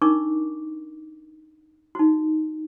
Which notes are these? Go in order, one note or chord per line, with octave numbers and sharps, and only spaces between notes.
D4 D#4 A#4 C#6 D6
D#4 F#4